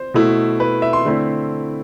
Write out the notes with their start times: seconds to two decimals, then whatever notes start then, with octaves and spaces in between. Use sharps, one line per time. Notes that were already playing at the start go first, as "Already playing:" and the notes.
Already playing: C5
0.14 B2 A3 E4
0.60 B4
0.82 E5
0.93 C6
1.05 D3 A3 C4 E4